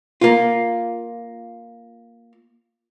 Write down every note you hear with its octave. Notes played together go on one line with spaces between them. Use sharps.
A#3 F4